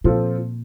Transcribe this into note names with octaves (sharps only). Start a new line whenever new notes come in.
A#2 F3 C4 F4 A4